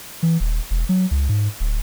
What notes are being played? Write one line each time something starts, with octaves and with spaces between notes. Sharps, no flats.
E3
D#1
E1
F#3
C#2
G#2
D1